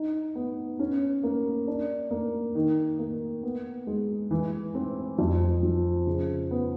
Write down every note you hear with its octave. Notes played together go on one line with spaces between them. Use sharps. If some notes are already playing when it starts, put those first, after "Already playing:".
Already playing: D#4
B3
C#4
A#3
D4
A#3
D#3
A#3
B3
G#3
E3
C4
F2
F3
C#3
B3